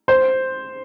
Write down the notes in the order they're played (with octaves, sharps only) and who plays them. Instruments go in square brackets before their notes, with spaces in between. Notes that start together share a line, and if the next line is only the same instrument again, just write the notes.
[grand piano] C5